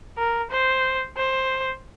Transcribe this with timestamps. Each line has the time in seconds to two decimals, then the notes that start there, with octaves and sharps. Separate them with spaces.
0.18 A#4
0.51 C5
1.17 C5